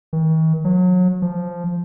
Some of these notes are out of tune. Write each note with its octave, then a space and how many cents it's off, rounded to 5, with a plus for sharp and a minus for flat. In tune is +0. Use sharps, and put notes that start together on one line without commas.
D#3 +45
F#3 -30
F3 -5